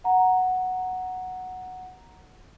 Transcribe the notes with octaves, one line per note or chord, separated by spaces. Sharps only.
F#5 A#5